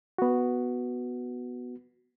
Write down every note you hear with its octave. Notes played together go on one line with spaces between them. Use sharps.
B3 F#4